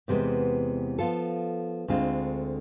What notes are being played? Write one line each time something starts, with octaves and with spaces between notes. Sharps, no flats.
E2 C3 E3 G#3 B3
F3 B3 F4 A4
D2 D3 G#3 C4 F4